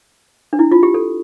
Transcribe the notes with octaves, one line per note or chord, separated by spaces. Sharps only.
D4
E4
F4
G4
A4